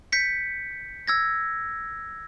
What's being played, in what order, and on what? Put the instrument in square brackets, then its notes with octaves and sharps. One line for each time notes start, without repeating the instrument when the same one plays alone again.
[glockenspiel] G6 B6 C#7
E6 G#6 A#6